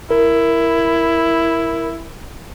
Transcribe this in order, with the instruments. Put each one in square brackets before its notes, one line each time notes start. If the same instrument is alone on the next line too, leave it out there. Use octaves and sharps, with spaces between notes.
[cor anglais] E4 [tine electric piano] A#4